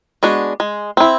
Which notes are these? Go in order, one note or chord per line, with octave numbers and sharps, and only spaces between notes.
G#3 B3 D4 F#4
G#3
C4 E4